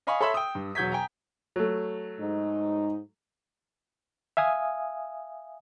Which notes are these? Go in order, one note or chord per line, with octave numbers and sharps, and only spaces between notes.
D#5 F5 G#5 B5 C#6 D#6
A4 C#5 E5 B5 C6 E6
G5 D#6
G2
E1 F#3 G6 G#6 B6
G5 G#5 A#5
F#3 A3
G#2 D#4
E5 F5 G#5 D#6